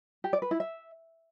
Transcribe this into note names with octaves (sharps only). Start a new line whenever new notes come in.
G4
D5
B4
E4
E5